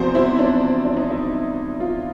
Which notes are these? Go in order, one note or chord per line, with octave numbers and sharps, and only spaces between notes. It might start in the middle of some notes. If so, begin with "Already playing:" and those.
Already playing: E2 C3 F3 F#4 C5
E4
D4
D4
D#4
E4
F4